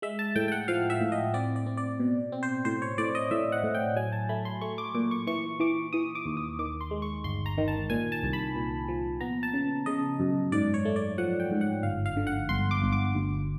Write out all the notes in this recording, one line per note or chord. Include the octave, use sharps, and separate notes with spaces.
G#3 E5
A5
A2 G5
G5
F#5
F3 F5
E5
A2
D#5
C4 D5
D5
C4
D5
B2
C4
C5
A2 C5
C#5
A2 D5
D#5
A2 E5
F#5
A2
G5
F#3 G#5
A5
A3 B5
C6
A3 C#6
D6
A#2 D6
C#6
E3 C#6
E3 D6
E3 D#6
D6
D#2
D#6
D#3 D6
C6
G#3
C#6
G1 C6
A#5
D#3
A5
A#2 G#5
A5
C2
B5
A#2
F3
B3 A#5
A5
C#3
C#3 D#5
F#2
G#2 D5
C#5
A3
D5
F3 F#5
G5
G#2
F#5
G1 F5
F5
D3
F#5
G1 C6
D6
G1
D6
D2